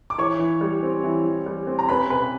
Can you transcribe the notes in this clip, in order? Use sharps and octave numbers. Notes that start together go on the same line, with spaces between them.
D6
E3 C#5 C#6
E3
G3
C4
E3
E3
G3
C4
A#5
C#4 B4 B5
C3 B4 B5